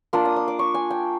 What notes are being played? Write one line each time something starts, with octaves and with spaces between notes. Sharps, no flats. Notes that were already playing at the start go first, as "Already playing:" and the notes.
A#3 D4 F4 D#6
D#6
D#6
D6
C#6
G#5
G5